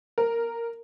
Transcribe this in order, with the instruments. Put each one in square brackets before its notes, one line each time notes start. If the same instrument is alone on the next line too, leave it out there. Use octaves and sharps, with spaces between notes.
[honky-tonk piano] A#4